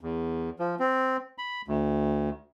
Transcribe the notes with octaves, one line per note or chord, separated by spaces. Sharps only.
E2
F3
C4
B5
D2